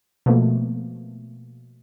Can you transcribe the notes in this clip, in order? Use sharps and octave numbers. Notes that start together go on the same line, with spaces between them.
B2 F3 A3 A#3